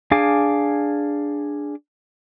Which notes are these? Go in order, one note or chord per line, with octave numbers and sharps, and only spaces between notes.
D4 G#4 F5 G#5 D6